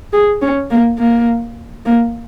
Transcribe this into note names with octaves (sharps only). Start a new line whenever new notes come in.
G#4
C#4
A#3
A#3
A#3